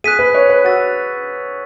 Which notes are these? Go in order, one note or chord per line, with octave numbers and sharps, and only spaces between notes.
G#4 F#6 B6 D#7
B4
C#5
B4
F#4 E6 A6 D#7